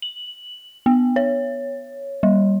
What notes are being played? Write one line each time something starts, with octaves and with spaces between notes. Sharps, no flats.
F#7
B3
C#5
G3